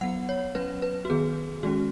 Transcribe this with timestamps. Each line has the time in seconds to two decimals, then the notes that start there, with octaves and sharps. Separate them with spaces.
0.01 F#3 B3 F#5
0.29 C#5
0.55 F#3 C#4 B4
0.82 B4
1.05 F#4
1.10 D#3 B3 G#4
1.63 D#3 G#3 C#4 F#4